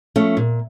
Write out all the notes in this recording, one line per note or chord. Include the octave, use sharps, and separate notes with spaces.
F3 A3 C#4
A#2